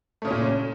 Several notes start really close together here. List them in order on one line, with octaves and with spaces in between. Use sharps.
A3 C#3 C#4 A#2